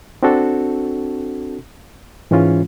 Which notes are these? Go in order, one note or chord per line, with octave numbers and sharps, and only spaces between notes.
C4 D4 F#4 A4
G#2 E3 G#3 C#4 F4